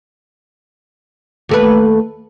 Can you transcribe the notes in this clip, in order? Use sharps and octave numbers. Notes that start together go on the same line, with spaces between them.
D#2 A3 B4